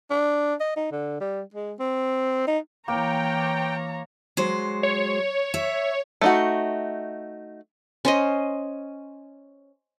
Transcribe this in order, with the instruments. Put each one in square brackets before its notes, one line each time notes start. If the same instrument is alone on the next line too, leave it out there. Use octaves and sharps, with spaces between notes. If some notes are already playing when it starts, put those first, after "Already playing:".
[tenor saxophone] D4
D#5
D#4
D3
G3
G#3
C4
D#4
[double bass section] E3 [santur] A#3 [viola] C#5 A#5 [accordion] G5
[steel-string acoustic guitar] F#3 G#3 C5
[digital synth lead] C#5
[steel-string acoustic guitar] E5
[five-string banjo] A3 D#4 F#4
[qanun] C#4 C5 D#5